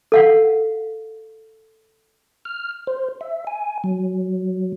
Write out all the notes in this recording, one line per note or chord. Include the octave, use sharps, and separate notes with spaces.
A4 F5 F#5
F6
C5
E5
G#5
F#3